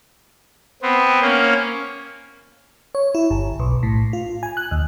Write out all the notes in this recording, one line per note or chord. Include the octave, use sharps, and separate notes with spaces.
B3 C4
A#3 C#4
C#5
E4
G1
B1
A2
F4
G#5
F#6
D#2